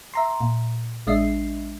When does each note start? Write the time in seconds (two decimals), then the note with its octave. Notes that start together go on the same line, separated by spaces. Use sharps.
0.14 E5 A#5 C6
0.41 A#2
1.07 A1 G#3 D4 D#5 E5 C7